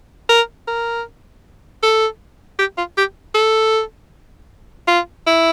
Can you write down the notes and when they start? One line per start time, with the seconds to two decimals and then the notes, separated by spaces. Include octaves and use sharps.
0.29 A#4
0.68 A#4
1.83 A4
2.59 G4
2.78 F4
2.98 G4
3.35 A4
4.88 F4
5.27 E4